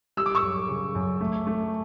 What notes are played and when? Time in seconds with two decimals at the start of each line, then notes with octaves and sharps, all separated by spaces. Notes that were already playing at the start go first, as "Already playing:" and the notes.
0.17 G3 E6
0.26 D6
0.35 C#6 E6
0.42 F#2
0.69 C#3
0.95 F#2
1.21 A3
1.47 A3